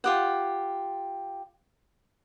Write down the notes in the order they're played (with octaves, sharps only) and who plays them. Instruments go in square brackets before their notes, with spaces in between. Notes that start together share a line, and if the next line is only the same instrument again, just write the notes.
[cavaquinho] F4 G4 F#5